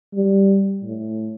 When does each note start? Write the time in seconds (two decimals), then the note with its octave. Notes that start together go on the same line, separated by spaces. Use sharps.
0.14 G3
0.83 A2